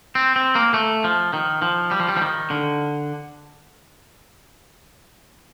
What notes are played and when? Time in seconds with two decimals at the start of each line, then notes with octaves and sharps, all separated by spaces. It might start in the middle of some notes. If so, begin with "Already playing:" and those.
0.15 C4
0.36 C4
0.55 A#3
0.74 A3
1.04 F3
1.33 D#3
1.62 F3
1.91 G3
2.00 F3
2.09 G3
2.17 F3
2.21 D#3
2.50 D3